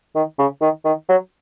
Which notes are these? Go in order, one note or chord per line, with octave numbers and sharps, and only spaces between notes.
D#3
C#3
D#3
D#3
F#3